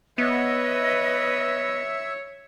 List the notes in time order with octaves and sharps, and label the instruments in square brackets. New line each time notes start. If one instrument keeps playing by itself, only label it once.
[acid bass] B3 [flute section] B4 D#5 [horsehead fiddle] C#5 [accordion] E5